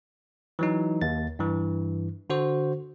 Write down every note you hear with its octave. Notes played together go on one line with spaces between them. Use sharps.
E3 F#3 D#4
D#2 A6
G2 E3
D3 F#4 C5